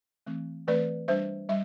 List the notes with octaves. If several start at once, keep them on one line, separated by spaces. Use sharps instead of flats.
E3 A3 C4
E3 A3 C4 B4 D5
G3 D4 C5 E5
G3 E5